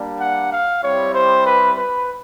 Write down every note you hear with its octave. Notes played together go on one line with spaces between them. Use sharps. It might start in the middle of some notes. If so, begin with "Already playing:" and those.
Already playing: G3 A#3 D4
F#5
F5
G3 C4 E4 G4 C#5
C5
B4
B4